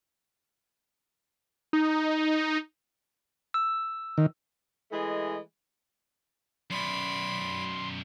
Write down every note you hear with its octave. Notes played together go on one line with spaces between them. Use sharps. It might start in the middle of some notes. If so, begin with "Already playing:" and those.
D#4
E6
D#3
E3 G#3 A3 G#4 D#5
F#2 B2 D5 B5 C6